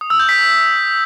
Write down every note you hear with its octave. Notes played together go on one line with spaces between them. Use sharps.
D#6
E6
G6
B6